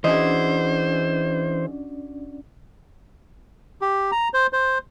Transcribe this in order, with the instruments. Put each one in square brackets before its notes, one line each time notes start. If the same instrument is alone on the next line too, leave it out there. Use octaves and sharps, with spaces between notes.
[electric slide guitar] E3 G#4 [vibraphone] C#4 D4 D5 [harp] F#4 D#5 [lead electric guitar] C5
[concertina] G4
A#5
C5
C5